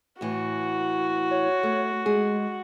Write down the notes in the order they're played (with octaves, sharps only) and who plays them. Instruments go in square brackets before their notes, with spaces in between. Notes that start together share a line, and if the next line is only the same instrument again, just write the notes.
[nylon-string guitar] A2 E3 [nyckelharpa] F#4
[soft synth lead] C#5
[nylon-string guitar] A3
[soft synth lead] G#3 [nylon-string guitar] G#4